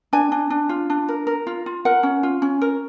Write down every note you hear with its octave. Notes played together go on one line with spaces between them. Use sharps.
D4 G#5
D4
D4
F4
D4
A#4
A#4
F4
F4
A#4 F#5
C#4
F4
C#4
A#4